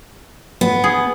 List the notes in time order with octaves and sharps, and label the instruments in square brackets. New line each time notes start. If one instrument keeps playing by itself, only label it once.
[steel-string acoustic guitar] B3
[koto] G#4